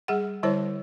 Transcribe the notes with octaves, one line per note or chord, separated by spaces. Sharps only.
G3 G#4 F#5
D3 G3 E4 C5 C#5 A5